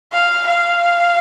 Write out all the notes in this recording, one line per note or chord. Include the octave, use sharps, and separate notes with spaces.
F5
F5